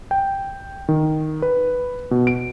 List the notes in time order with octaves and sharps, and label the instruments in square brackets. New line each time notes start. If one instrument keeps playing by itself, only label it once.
[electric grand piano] G5
D#3
B4
B2
D7